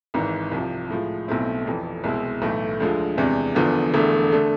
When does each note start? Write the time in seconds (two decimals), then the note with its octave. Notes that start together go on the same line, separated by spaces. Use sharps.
0.14 G#1 G#2 E3
0.52 C2 C3 F3
0.90 A2 F3 G#3
1.28 B1 B2 A3 C4 E4
1.65 F1 F2 E3
2.04 C2 B2 G#3 C4 E4
2.42 B1 A2 E3 A3
2.80 D2 D3 F3 G#3
3.17 E2 C3 E3 G#3 D4
3.55 E1 E2 D3 F3 B3
3.94 E1 E2 D3 A3
4.32 D3 A3